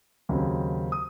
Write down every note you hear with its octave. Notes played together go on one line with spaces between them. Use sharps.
D#2 C#3 F#3 C4
D#6